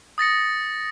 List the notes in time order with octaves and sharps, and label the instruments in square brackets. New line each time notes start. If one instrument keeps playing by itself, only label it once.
[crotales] D#6 A6 A#6 C#7